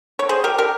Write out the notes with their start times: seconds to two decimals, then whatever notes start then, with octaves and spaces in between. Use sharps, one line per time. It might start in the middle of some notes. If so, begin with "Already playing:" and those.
0.19 C#5
0.29 G#4 C5
0.44 G4 A#4
0.58 G4 A#4